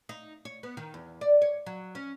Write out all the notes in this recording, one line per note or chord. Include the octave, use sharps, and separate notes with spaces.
D#4
C#5
B3
D#3
E2
D5
C#5
F#3
C#4